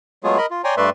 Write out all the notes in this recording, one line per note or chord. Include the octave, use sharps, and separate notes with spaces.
F#3 G#3 A3 B3 F4 G#4
A#4 D#5 B5
F4
C#5 D5 G5 G#5 A#5 C6
G2 A3 B4 D5 E5 C6